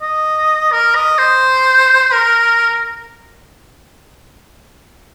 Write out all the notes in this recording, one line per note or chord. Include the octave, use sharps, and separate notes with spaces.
D#5
A#4
D#5
C5
A#4